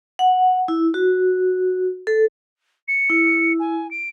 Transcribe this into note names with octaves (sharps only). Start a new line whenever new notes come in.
F#5
E4
F#4
A4
C#7
E4
G#5
D7